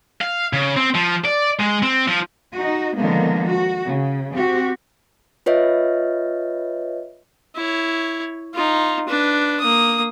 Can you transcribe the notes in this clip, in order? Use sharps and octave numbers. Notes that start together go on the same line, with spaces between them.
F5
C#3
C4
F3
D5
G#3
C4
F3
D#4 F#4
D3 D#3 F3 G#3 A#3 B3
F#4
C#3
C4 F#4 G4
F4 B4 C#5 D#5 E5
E4 C#5
D#4 F4
D4 B4
A#3 D#6